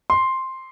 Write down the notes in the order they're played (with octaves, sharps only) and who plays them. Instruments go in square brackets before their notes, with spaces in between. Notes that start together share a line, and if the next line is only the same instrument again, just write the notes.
[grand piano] C6